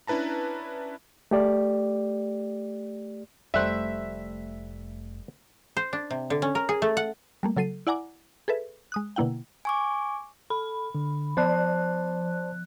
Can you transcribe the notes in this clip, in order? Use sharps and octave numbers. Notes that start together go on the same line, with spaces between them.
C#4 D4 E4 B4 A5 A#5
A3 G4 D5
F1 G3 A3 C5 E5 F#6
C5
D4
C3
D3
C#4
A#4
G#4
A3
F#5
G3 A3 A#3
C#3 F#3 A4 C7 D#7
E4 D5 F#5 G#5 A#5 D6
G#4 A4 B4 E5
G#3 D#6 F#6
B2 D3 A#3 E4 F#5 G5
G#5 C#6 D6
A4 B5
D3
F3 C5 D5 A5 F#6